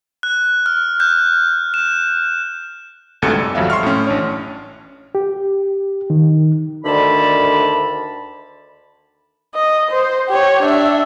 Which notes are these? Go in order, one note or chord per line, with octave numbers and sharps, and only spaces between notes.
F#6
F6
F#6 G6
E7
G1 D2 G#2 C3 A4 C#7
G3
G#1 F2 F#3 E5 F5
C6 C#6 F6
A2 C#4
A1 D4 C#5
G4
D#3
D2 D3 D#3 A5 B5
D#5
C5
G4 C#5
D4 E5